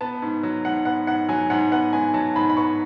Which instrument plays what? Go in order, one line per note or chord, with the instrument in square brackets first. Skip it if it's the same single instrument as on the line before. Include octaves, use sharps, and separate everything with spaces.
[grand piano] B3 A5
G#2
F#3
G#2 F#5
B3 F#5
G#2 F#5
F#3 G#5
G#2 F#5
B3 F#5
G#2 G#5
F#3 A5
G#2 B5
B5
B3 C#6